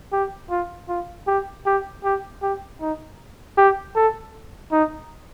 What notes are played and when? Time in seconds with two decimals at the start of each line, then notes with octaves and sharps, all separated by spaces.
0.13 G4
0.50 F4
0.89 F4
1.27 G4
1.66 G4
2.04 G4
2.42 G4
2.81 D#4
3.58 G4
3.96 A4
4.72 D#4